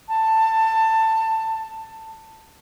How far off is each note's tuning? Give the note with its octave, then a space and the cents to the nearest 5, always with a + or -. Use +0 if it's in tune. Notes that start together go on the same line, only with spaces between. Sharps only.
A5 +20